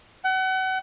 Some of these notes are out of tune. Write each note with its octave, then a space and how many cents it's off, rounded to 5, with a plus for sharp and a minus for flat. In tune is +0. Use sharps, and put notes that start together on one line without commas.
F#5 +35